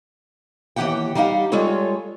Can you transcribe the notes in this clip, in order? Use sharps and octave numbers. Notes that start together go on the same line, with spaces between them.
D#2 E3 D#4 G4 F#5 G5
G3 D#4 G4 F5 F#5
G3 G#3 F4 A4 C#5